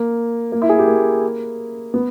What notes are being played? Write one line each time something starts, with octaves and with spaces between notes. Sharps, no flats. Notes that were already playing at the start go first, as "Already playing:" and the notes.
Already playing: A#3
A#3
E4
G#4
G4
A#3
B3